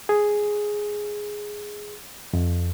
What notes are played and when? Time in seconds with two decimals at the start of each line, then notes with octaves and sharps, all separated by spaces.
0.09 G#4
2.33 F2